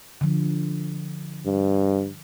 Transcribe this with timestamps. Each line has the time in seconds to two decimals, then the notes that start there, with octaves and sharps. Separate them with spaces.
0.21 D3 F3
1.46 G2